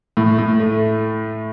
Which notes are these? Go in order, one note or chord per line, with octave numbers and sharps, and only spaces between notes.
A2
A2
A3